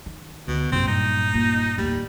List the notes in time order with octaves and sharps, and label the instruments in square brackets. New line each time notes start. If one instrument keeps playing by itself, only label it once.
[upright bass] D#3
[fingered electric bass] D2 [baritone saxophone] B2
[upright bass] A#1 [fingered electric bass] F#2 C3 [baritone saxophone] C4
[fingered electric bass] G2 A#2 [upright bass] F#3 [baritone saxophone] D#4
[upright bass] A#3 F4
[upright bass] A1 D#2 [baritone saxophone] G3